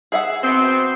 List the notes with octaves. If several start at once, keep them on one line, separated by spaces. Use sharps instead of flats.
G#4 E5 F#5
B2 B3 C4